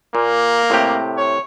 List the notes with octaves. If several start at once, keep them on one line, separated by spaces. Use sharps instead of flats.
A#2 A#3
A2 C3 G4
C#5